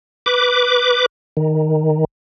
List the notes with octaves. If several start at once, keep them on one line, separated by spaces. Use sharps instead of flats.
B4 D6
D#3